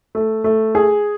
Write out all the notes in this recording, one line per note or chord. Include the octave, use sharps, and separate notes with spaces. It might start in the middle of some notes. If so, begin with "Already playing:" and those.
A3
A3
G#4